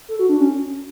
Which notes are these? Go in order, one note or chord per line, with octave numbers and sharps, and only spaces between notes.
A4
F#4
D4
C#4